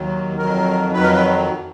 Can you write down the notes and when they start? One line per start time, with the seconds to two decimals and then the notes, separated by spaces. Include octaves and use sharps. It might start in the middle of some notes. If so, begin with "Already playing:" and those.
Already playing: D#2 D#3 F#3
0.36 F2 D#3 F#3 A#4
0.93 F2 D#3 F#3 B4
1.03 A#4
1.13 B4